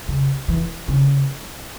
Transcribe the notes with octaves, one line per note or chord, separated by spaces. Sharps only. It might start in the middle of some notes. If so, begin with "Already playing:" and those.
C#3
E3
C#3